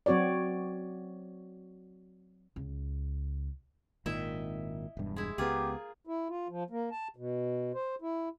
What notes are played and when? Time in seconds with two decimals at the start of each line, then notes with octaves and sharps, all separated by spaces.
0.06 F#3 C4 F#4 C#5 D5
2.56 C#2
4.06 G#1 A#2 D#3 E4 D#5 E5
4.97 E1 G2
5.16 G#3 E4
5.38 C#2 A#3 B3 F4 G4 G#4
6.07 E4
6.29 F4
6.49 F3
6.70 A#3
6.91 A5
7.16 B2
7.74 C5
8.02 E4